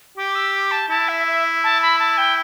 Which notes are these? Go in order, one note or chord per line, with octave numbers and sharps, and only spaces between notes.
G4 D6
E6
D6
A5
E4 A5
E5
E5
A5
B5
A5
G5